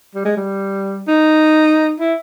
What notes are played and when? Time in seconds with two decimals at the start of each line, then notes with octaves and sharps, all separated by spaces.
0.15 G3
0.25 G#3
0.37 G3
1.08 D#4
2.00 E4